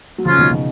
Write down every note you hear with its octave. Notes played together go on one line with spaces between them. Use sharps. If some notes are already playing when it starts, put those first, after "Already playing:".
F#3
C#3 F3 G#3 C#4 F4
B2 D#3
B2 D#3